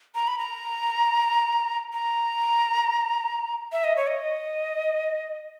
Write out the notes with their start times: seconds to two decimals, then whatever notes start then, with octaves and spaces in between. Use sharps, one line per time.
0.15 A#5
0.27 B5
0.38 A#5
1.93 A#5
3.72 E5
3.84 D#5
3.96 C#5
4.07 D#5